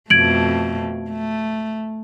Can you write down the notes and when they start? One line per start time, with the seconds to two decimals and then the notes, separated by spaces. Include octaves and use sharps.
0.10 F2 B2 A3 G#6 D7 F#7
1.09 A3